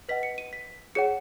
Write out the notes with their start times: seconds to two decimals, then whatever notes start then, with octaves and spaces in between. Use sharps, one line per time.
0.09 B4 D#5 F#5 B6
0.23 C#7
0.38 D#7
0.53 B6
0.95 G#4 C#5 F#5 C#7